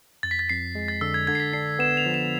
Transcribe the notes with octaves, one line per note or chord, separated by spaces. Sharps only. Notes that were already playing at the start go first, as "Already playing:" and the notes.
F2 A6
B6
A6
F2 C7
G#3
A6
D3 E6
G#6
D3 G#6
C7
B6
D4 C7
B3 E7
F7
F3
E7